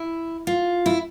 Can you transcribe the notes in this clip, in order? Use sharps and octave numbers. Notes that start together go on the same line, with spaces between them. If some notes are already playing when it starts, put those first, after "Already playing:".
Already playing: E4
F4
E4